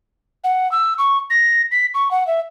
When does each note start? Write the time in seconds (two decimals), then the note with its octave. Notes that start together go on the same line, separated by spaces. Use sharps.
0.44 F#5
0.72 E6
0.98 C#6
1.30 A#6
1.71 B6
1.94 C#6
2.11 F#5
2.27 E5